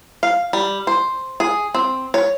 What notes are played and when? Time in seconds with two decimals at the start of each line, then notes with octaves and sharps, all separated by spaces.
0.23 F5
0.53 G3
0.87 C5
1.40 G#4
1.75 C4
2.14 C#5